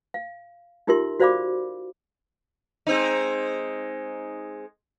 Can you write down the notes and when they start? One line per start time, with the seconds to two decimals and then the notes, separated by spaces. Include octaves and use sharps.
0.14 F5
0.87 D#4 F4 G4 A#4 E5 C6
1.20 F#4 C5 D5 F5 B5 D6
2.87 G#3 C4 D#4